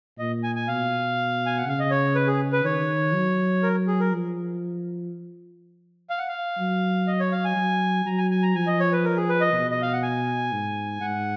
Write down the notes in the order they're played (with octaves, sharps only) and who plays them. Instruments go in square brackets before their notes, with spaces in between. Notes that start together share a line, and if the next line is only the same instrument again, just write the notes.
[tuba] A#2 [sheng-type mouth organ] D#5
[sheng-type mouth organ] G#5
G#5
[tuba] B2 [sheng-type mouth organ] F5
[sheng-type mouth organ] G#5
F#5
[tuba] C#3 [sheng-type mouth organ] F5
[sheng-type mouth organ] D#5
C#5
B4
G#4
B4
[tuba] D#3 [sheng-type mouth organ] C#5
[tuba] F#3
[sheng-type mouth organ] A#4
G#4
A#4
[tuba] F3
[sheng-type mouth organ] F5
F#5
F5
[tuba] F#3
[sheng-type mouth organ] D#5
C#5
F5
G#5
[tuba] F#3
[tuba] F#3 [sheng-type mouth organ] A#5
[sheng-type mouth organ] G#5
G#5
A#5
[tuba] F3 [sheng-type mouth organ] G#5
[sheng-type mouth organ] D#5
C#5
B4
A#4
G#4
B4
D#5
[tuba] B2
[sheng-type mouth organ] D#5
F5
F#5
G#5
[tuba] G#2
[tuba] G#2 [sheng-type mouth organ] F#5